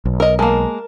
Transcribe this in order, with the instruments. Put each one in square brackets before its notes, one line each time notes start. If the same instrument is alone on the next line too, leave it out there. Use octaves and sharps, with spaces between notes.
[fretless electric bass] B1
[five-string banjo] A#4 D#5
[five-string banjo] G#3 A#3 [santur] A#4 A5